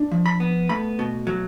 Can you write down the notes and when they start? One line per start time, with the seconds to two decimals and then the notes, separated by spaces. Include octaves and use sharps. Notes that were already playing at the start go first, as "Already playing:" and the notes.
Already playing: D4
0.11 F3
0.26 B5
0.40 B3
0.69 A3 B5
0.99 B2
1.27 F#3